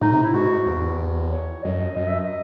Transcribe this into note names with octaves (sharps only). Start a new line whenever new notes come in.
A2 D#4
C3 D#4
E4
G#2 F#4
E2
C#5
F#2 D#5
F#2 D#5
E5
D#5